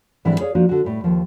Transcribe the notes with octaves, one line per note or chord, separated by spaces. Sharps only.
G#2 E3 G3 C4 D4
G#4 C#5 D5 F5
F3 A#3 D4 F#4
D3 F#4
A2 G3
D#2 F3